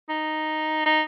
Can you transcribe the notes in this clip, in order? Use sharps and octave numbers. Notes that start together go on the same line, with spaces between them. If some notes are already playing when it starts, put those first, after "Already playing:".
D#4
D#4